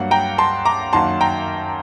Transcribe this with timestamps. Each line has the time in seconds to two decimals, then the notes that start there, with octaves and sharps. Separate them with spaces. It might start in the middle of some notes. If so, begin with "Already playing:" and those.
Already playing: G2 F#3 A#3 F#5
0.11 G5 A#5
0.38 A5 C6
0.65 A#5 D6
0.93 F#2 D#3 F#3 A#3 A5 C6
1.21 G5 A#5